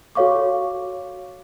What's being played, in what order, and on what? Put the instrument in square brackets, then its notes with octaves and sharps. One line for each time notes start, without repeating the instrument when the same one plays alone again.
[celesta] F#4 A4 C#5 F5 C#6 D6